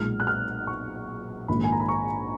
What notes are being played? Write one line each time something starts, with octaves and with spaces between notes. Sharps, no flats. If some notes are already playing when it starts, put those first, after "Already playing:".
Already playing: B1 A#2 G#3 F6
F#6
F6
C#6
A#1 G#2 D#3 A#3 F4 B5
G#5
A#5
B5
C#6